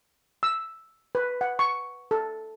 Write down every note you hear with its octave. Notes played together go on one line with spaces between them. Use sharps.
E6
B4
F#5
C#6
A4